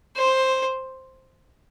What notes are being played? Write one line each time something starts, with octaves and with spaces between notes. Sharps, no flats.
C5